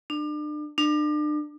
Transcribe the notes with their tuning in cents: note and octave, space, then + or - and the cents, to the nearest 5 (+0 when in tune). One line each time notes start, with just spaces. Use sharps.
D4 +35
D4 +35